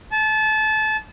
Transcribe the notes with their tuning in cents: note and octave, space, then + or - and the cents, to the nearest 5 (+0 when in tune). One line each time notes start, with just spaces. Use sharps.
A5 -25